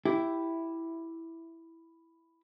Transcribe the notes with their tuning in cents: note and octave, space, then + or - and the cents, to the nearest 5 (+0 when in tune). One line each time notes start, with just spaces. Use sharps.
E4 +0 G4 -5